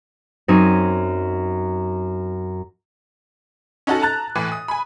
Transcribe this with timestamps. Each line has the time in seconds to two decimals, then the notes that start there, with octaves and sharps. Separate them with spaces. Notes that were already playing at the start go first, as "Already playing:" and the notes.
0.48 F#2 C4 D#4 G#6 D#7
3.87 C#4 D#4 F#4 A4
4.02 A5 A#5 F#6 A6
4.35 A2 E3
4.52 D#6
4.68 G#5 B5